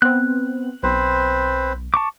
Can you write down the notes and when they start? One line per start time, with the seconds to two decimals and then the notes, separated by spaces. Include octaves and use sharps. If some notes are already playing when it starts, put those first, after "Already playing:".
0.02 B3 C4 F#6
0.83 B1 C4 B4 C5
1.94 A5 C#6 D6